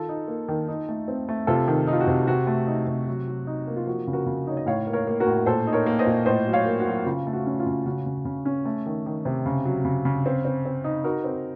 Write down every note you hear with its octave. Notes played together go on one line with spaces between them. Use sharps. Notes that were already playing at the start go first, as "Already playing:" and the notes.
Already playing: D#3 F4 A4
D#4
A#3
D#3
D#4
A3
C4
A3
C3 F4 A4
D#3
D#4
F4
F#4
C3
C3 F#4
A3
D#4
C3
F#3
F#3
D#4
A#3
F4
F3 F#4
C#3
F#4 A#4
C#3
D#4 C#5
D#5
A2 C#5 F5
A#3
A#4 C#5
A#3
F#4 A#4
A2
A#2 A4 C5
D#4
A#4 C#5
A#3
C5 D#5
A#2
A2 C5 D#5
F#3
C#5 F5
A#3
F#4
F#3
C#3 F4
A3
F#4
C#4
F4
C#3
C#3 F#4
C#3
C#3
C#4
A3
D#3
D#3
C3
C#3
F#3
C#3
C#3
C4
C4
C4
D#4
D#4 F#4 A#4
C4